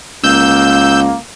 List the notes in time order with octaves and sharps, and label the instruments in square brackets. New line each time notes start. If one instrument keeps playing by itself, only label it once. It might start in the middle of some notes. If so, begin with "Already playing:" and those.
[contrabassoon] C#2 [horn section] A#3 [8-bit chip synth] E6 G6